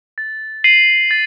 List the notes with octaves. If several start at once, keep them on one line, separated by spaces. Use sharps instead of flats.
A6
C7 D#7 F#7
A6